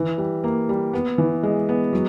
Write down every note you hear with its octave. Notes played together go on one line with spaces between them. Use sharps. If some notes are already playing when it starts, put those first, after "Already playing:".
Already playing: E3
G3
A#3
G3
B3
E3
G#3
B3
F#3